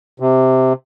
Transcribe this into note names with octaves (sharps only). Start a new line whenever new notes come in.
C3